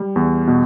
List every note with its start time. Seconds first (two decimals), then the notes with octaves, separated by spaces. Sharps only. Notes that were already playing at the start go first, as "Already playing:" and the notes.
Already playing: G3
0.16 E2
0.47 B2